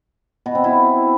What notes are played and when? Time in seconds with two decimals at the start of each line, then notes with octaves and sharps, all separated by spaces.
0.46 B2
0.55 C4
0.64 E4